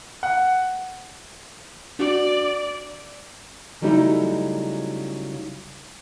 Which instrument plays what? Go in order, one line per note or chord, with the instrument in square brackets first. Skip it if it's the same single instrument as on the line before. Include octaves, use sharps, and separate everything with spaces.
[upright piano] F#5
[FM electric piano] D4 F#4 [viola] D5
[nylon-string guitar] C#3 F#3 G3 A3 D#4 E4